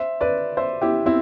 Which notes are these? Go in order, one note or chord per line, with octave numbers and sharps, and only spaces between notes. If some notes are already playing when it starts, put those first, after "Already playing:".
Already playing: C5 E5
B4 D5
C5 E5
E4 G4
C4 E4